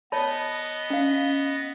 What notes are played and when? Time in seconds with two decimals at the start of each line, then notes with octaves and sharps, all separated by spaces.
0.12 B3 C#5 D#5 A5 B5
0.90 C#4 F5